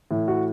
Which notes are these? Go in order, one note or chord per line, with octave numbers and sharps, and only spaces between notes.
A2 E3
F#4